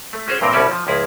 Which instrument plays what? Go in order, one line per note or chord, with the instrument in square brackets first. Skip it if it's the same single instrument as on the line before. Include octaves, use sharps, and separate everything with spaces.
[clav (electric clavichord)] A3
C#4 F#4 G#4 C5 C#5
E2 G2 A#2 C4 A#4 G5
C2 B2 G3 C#4 D5 E5
F3
C#2 F3 E4 G#4